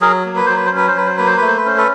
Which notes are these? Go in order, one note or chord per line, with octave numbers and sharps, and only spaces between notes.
F#3 G#4 A#4
A#3
B4
F#3 C5
B4
C5
C#4 B4
C5
F#3 B4
C5
A#3 B4
C5
A3 B4
C5
B4
C#4 C5
A4 B4